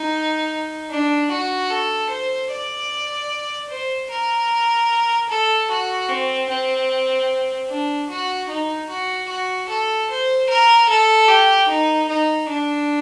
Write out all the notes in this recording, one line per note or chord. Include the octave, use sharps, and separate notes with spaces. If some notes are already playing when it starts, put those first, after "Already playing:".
Already playing: D#4
D4
F#4
A4
C5
D5
C5
A#4
A4
F#4
C4
C4
D4
F#4
D#4
F#4
F#4
A4
C5
A#4
A4
G4
D#4
D#4
D4